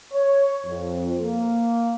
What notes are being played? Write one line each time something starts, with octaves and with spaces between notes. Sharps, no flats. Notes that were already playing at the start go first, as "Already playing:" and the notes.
C#5
F2
A#3